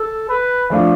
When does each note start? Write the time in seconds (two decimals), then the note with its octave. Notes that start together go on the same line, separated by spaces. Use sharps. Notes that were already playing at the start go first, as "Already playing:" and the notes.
Already playing: A4
0.29 B4
0.70 F3 A3 D4 F4